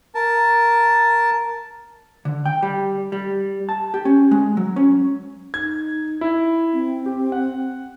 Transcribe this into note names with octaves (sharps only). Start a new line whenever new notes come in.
A#4 A5
D3
G5
G3
G3
A5
G4
C#4
G#3
F#3
C#4
D#4 G#6
E4
C4
G4
F#5